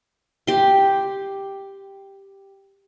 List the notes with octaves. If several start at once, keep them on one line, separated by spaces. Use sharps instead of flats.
G4 C6